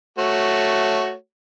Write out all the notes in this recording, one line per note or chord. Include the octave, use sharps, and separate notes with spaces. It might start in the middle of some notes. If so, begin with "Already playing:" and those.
A3 F#4 C#5